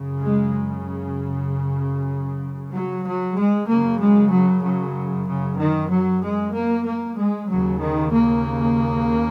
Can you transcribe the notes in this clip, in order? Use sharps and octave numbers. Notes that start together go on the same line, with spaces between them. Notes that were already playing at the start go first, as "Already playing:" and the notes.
Already playing: F#2 C#3
G#3
F#3
F#3
G#3
F#2 C#3 A#3
G#3
F#3
F#3
C#3
D#3
F#3
G#3
A#3
A#3
G#3
D#2 C#3 F#3
D#3
A#3